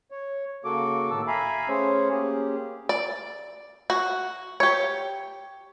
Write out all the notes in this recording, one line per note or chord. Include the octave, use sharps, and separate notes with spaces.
C#5
C#3 A#3 F#4 A4 D6
A2 D#3 A#3 A5 E6
E5 F5 G#5 A#5 B5
A3 C#4 G#4 C5 C#5
A#3 C#4 G4 G#4
D5
F#4
G4 C#5